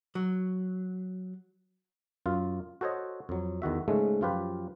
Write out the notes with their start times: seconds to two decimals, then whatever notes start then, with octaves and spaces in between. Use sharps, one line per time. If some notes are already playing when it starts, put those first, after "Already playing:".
0.15 F#3
2.26 F#2 F4 F5
2.81 F#4 A4 C5 C#5 D#5
3.29 F2 F#3
3.62 E2 D#3 F#4 E5
3.88 G#2 C#3 G#3 A3
4.21 F#2 F3 F4 G4 B4